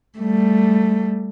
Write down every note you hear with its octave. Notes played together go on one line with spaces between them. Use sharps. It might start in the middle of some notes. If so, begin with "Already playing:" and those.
G3 A3